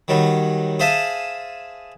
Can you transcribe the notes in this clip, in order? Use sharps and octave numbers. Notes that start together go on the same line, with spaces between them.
D#3 F#3 G3
G#4 C5 E5 F5 G#5 A5